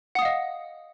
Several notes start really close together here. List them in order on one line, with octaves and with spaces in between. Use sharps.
F#5 D#6 F5 D#5